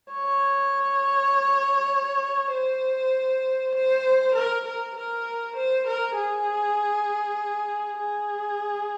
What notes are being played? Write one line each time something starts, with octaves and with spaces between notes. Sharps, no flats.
C#5
C5
C5
A#4
A#4
A#4
C5
A#4
G#4
G#4